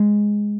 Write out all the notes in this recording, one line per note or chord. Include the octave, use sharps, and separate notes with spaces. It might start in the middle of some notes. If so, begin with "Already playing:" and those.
Already playing: G#3